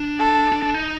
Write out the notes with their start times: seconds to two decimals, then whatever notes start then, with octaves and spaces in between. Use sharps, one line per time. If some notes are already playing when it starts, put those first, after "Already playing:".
Already playing: D4
0.20 A4
0.52 D4
0.62 D4
0.74 D#4